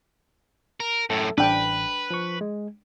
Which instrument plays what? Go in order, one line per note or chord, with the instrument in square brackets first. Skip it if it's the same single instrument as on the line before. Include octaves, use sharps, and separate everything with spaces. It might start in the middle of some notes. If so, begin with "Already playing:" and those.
[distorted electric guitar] A#4
[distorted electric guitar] F#2 A2 [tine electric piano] A4
[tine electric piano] A1 [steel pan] D4 G5 [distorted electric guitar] B4
[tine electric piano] F3 C#6
G#3